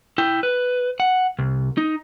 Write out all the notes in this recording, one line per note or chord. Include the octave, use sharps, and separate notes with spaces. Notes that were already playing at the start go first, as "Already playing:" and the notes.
E4 G5
B4
F#5
C2
D#4